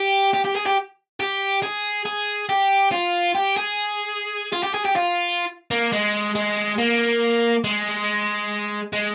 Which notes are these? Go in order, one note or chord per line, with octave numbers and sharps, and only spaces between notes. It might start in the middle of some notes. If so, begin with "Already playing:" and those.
Already playing: G4
G4
G4
G#4
G4
G4
G#4
G#4
G4
F4
G4
G#4
F4
G4
G#4
G4
F4
A#3
G#3
G#3
A#3
G#3
G#3